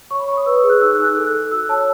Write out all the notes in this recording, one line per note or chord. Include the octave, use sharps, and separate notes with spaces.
C#5 C#6
B5
C#5 C#6
D#6
B4 E6
E6
G#4
F#6
D#4 E6
F#6
D#4
F#6
A4
F#6
A4
F#4 E6
C#5 A5